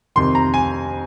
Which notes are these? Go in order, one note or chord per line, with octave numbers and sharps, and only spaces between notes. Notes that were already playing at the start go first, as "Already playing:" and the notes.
F2 C3 D#3 C6
A#5
G#5